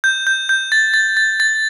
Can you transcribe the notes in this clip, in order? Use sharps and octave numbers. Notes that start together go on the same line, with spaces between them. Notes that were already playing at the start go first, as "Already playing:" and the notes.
G6
G6
G6
A6
A6
A6
A6